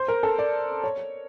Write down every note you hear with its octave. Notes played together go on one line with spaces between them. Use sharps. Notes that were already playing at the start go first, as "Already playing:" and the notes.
Already playing: C5
A#4
A4
D5
C#5